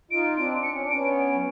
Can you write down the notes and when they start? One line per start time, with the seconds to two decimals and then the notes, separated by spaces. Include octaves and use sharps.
0.11 D#4 F4 D7
0.38 C4 D4 D7
0.63 C#7
0.72 C#4
0.82 D4
0.89 B3 C#4 D7
1.32 F#3